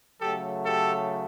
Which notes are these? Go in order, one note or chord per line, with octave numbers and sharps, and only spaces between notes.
C#3 F#3 A3 G4 A4
G4 A4